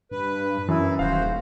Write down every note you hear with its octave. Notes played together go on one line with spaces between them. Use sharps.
G2 B4
F#2 E3 E4
D#1 F#2 F#4 C5 F5
D#1